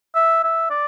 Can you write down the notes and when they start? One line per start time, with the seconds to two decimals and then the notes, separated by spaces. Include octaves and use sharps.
0.15 E5
0.43 E5
0.70 D5